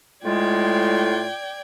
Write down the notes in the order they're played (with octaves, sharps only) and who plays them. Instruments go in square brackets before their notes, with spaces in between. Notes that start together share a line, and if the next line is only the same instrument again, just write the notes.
[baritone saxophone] A2 [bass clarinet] G#3 [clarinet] F4 [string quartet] D5 G5 G#6